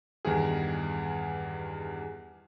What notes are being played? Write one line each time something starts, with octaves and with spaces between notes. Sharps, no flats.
E2 G2 D#3 G#4